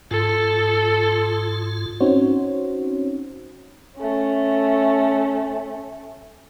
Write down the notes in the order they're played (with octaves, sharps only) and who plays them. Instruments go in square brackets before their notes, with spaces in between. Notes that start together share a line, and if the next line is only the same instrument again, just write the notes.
[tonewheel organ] G#2 F4 [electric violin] A4
[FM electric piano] C4 C#4 D#4 F#4 C5 C#5
[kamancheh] A3 C#4